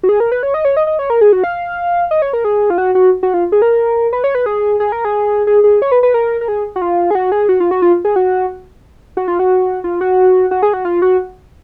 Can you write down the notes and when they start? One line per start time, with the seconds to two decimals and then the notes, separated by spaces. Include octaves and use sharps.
0.03 F#4
0.09 G#4
0.20 A#4
0.32 B4
0.43 C#5
0.54 D#5
0.65 C#5
0.77 D#5
0.87 D#5
0.99 C#5
1.10 A#4
1.21 G#4
1.33 F#4
1.44 F5
2.11 D#5
2.22 C#5
2.33 A#4
2.44 G#4
2.70 F4
2.78 F#4
2.95 F#4
3.23 F#4
3.34 F4
3.52 G#4
3.62 A#4
4.13 B4
4.24 C#5
4.35 B4
4.46 G#4
4.80 G#4
4.92 A#4
5.05 G#4
5.47 G#4
5.64 G#4
5.82 C#5
5.92 B4
6.03 B4
6.14 A#4
6.41 A#4
6.48 G#4
6.76 F#4
6.82 F4
7.11 G#4
7.15 F#4
7.32 G#4
7.49 F#4
7.60 F4
7.71 F#4
7.82 F4
8.05 G#4
8.16 F#4
9.17 F#4
9.28 F4
9.39 F#4
9.84 F4
10.01 F#4
10.51 F#4
10.62 G#4
10.73 F#4
10.85 F4
11.02 F#4